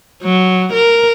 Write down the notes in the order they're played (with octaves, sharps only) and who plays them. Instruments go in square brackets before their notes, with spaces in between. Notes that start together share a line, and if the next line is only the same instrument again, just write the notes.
[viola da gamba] F#3
A#4